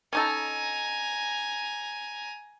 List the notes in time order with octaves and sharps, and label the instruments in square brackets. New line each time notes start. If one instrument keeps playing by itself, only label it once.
[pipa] C#4 D#4 A4 [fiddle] G#5 A#5